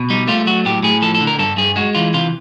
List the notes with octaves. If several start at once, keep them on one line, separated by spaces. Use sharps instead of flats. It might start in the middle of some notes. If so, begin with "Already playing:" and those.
Already playing: B2
G3 D#4
A3 F4
F#3 F#4
A2 G4
A2 G#4
F3 A4
A4
D3
A#4
G2 A4
G2 G#4
G#3 F#4
E3 F4
C3 F4